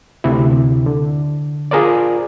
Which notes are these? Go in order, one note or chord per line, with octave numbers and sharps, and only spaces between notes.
D2 C3 E4
D3
F4 G#4 A#4 C5 D5